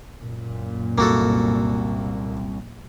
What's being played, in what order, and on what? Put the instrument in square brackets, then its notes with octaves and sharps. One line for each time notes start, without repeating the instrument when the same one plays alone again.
[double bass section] F#2 A#2
[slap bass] C2 [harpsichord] A#3 F#4 A4